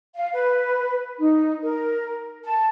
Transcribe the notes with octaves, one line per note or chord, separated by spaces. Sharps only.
F5
B4
D#4
A#4
A5